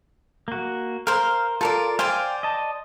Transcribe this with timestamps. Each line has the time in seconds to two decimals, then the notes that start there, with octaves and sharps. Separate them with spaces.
0.48 A#3 F#4
1.07 A#4 C5 F5
1.61 F4 A4 A#4 D5
1.99 C5 D5 F5 G5 G#5
2.43 D#5 A5